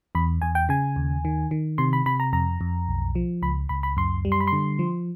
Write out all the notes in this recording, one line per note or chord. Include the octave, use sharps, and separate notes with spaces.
E2 B5
E2 G#5
G5
C#3 G#5
D#2
D#3
D#3
C3 C6
B5
C3 B5
A#5
F2 A#5
F2
B1
F3
C#2 B5
C#2 B5
B5
F#2 C6
G3
C6
B5
D3 C6
F3